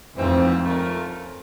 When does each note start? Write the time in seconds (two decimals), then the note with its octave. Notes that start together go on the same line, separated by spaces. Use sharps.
0.17 F2 G#2 E3 A3 C4
0.64 A3 C#4 F4 A#4